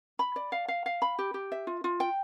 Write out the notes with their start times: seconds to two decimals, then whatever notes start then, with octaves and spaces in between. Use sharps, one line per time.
0.19 B5
0.36 D5
0.52 F5
0.68 F5
0.86 F5
1.02 B5
1.19 G4
1.34 G4
1.52 E5
1.67 F4
1.84 F4
2.00 G5